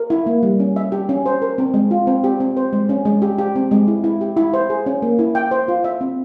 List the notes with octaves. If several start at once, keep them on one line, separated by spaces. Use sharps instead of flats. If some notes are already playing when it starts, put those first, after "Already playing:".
Already playing: A#4
E4
A#3
G3
C#4
E5
G4
C#4
C5
A#4
C4
G#3
F4
C4
G4
C4
C5
G#3
C#4
G#3
G4
G4
C4
G#3
E4
E4
G4
E4
C5
G#4
C#4
A#3
E4
G5
C5
F4
E5
C4